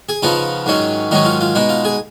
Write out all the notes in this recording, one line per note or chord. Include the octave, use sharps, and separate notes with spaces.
G#4
C#3 F3 B3 D#4 F4
G#2 D#3 F#3 C#4
G#2 D#3 F#3 C#4 D#4
F4
F4
B2 G#3 D#4
F4
G#4